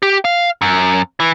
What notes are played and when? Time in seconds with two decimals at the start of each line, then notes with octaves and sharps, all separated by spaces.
0.03 G4
0.25 F5
0.62 F#2
1.20 E3